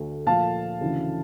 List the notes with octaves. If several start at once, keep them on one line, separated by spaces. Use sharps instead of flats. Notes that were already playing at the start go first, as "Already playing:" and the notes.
Already playing: D2 D3 A3
A#2 F3 A3 F5 A5
D2 C#3 E3